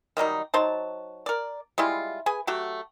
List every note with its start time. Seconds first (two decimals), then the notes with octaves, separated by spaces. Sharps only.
0.17 D#3 F#3 G3 D#4
0.54 F#3 D#4 C5 A5
1.26 A#4 D5
1.78 G3 G#3 E4 F4
2.26 G#4 B4 G#5
2.47 F#3 A3 F#4 G4